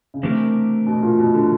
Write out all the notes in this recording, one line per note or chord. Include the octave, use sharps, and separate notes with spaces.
C#3
C3 E3 A3 D4 G4 A#4
B2
A#2
B2
D3